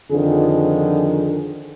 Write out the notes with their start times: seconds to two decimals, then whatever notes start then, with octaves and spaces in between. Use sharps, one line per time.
0.10 F2 D3 D#3 F3 G#4